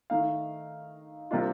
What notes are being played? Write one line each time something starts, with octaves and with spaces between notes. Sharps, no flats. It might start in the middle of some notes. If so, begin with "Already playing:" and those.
D#3 A3 D#4 F5
C3 G3 A#3 D4 F4